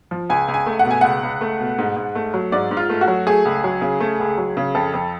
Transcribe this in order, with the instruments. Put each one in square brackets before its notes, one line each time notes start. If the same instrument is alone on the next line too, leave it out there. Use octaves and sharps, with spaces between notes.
[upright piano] F3
C#2 G#5
C#2
G#5
A3
F#5
B2
G#5
C#2 F#5
C#2
A3
B2
G#2
G#2
A3
F#3
G#2 D5
G#2
F4
A3
F#4
F#3
A3 G#4
C#2
F#3
C#3
A3
C#2
F#3
C#3
F2 A4
F2